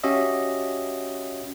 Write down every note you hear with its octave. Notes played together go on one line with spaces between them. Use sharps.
C#4 F#4 G4 D#5 E5